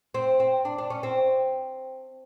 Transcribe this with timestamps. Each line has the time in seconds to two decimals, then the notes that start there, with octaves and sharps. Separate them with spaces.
0.14 C4
0.40 C4
0.65 D4
0.78 D4
0.90 C#4
1.03 C4